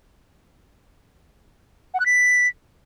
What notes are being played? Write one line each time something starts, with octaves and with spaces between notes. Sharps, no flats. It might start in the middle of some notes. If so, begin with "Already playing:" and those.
F#5
F#6
B6